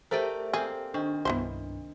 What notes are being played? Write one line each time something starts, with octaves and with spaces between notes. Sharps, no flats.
A3 G4 A4 A#4 C5 D5 E5 G5
A#3 C4 G#4
D#3 D4
C2 G2 B3 E4 C5